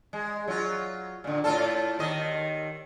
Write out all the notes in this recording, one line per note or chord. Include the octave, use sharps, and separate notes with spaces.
G#3
F#3 F4
A#2 D3
A2 F4 A4
D#2 D#3 D#5